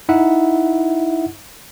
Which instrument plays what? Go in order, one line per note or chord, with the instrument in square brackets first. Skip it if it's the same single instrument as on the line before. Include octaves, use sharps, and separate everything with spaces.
[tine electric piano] D#4 E4 E5 F#5